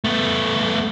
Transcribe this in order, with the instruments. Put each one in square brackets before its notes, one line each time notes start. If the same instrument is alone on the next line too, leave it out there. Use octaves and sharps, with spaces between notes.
[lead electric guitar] A3 B3